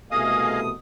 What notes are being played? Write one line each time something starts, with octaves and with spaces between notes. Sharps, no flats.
C2 B2 A3 G#4 D#5 F5 D#6